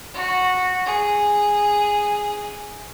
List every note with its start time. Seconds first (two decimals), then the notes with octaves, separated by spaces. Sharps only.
0.14 F#4
0.86 G#4